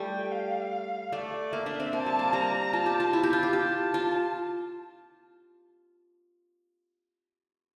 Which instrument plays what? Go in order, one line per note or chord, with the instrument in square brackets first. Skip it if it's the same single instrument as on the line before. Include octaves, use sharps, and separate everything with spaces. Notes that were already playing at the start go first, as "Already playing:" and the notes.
Already playing: [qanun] G3 A3 [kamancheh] G5
[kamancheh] F5
[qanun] A3 [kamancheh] D5
[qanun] A#3 [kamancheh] E5
[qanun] D4
C4
[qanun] A#3 [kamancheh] A5
[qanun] G3
A#3
[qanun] G3 [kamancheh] A#5
[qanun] F4 [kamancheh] A5
[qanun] G4
F4
E4
G4
F4
G4
[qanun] G4 [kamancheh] A5
[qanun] F4